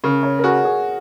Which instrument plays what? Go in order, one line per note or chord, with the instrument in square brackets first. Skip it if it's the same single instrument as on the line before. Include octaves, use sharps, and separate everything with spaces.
[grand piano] C#3 [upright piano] A#4
[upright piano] C#5
A#4
[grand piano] F#4 [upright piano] G#4
[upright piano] G#4